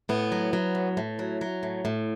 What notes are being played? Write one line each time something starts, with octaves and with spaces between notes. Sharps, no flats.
A2 B3
F#3
F#3
A2
A2
F#3
F#3
A2
A2